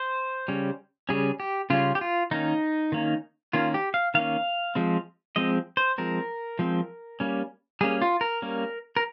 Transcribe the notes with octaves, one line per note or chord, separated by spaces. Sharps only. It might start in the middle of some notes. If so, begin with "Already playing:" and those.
Already playing: C5
C#3 G3 C#4
C#3 G3 C#4 G#4
G4
C#3 G3 C#4 F4
G4
F4
D#3 A#3 C#4 D#4
D#3 A#3 C#4
D#3 A#3 C#4 F4
G4
F5
D#3 A#3 C#4 F5
F3 G#3 C4
F3 G#3 C4 D#5
C5
F3 G#3 C4 A#4
F3 G#3 C4
G3 A#3 C#4
G3 A#3 C#4 G#4
F4
A#4
G3 A#3 C#4
A#4